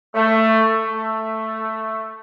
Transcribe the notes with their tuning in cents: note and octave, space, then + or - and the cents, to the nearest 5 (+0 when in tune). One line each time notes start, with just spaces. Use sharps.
A3 +15
A3 +5